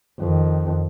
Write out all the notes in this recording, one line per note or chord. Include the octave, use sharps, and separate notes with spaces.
F2 D#3